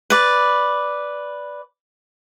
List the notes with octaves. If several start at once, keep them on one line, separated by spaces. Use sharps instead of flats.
B4 D5